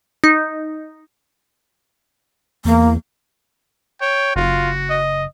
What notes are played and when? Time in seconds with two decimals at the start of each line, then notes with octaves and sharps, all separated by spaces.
0.24 D#4
2.65 E2 A#3
4.01 C#5 G5
4.36 F#1 F4 F#4
4.90 D#5